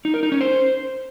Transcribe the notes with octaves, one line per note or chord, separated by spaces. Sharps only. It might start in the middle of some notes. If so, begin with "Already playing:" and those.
D#4
A#4
D#4
C#4
C5